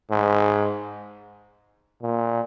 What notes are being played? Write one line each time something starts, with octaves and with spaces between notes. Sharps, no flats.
G#2
A#2